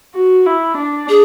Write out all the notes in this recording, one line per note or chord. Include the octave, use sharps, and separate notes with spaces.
F#4
E4
D4
G#4